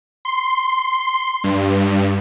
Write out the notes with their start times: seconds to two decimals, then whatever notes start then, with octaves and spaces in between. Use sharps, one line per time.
0.25 C6
1.44 G2